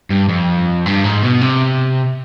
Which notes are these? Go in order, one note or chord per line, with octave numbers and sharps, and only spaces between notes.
G2
F2
G2
G#2
B2
C3